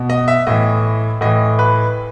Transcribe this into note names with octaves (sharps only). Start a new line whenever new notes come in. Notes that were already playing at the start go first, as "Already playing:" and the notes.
Already playing: B2
D#5
E5
A2 E3 D#5
A2 E3 D#5
B4